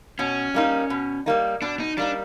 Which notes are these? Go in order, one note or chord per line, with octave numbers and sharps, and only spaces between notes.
B2 C#4
G3 A#3 D#4
B2
G3 A#3 D#4
B2 D4
D#4
G3 A#3 D4 D#4